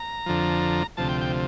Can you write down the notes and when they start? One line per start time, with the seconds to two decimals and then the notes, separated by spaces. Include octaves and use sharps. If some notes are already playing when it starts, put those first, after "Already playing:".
Already playing: A#5
0.26 F2 D3 F3
0.97 D2 C3 F3 A5
1.09 G5
1.21 G5